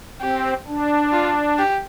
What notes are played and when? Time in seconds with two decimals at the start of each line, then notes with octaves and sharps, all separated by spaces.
0.21 C4 G4
0.67 D4
1.12 F4
1.58 G4